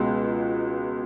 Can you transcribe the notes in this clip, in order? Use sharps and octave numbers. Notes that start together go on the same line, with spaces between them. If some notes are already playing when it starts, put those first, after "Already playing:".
Already playing: C#2 B2 G#3